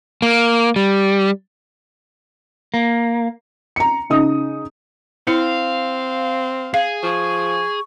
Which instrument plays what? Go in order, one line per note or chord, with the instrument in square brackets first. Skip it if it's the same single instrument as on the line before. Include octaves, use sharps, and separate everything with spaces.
[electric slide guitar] A#3
G3
[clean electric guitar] A#3
[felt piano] A#5 C#7
C#3 D#4 D#6
[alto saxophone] C4 [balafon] E4 [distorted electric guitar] F5
[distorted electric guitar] G#4 [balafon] F5
[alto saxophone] F3 [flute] C#6